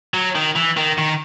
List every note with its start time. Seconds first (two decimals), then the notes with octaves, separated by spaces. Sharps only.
0.14 F#3
0.36 D#3
0.56 E3
0.77 D#3
0.98 D#3